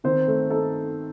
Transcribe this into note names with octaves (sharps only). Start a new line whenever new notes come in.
D#3 C4 C5
A3
D#4 A4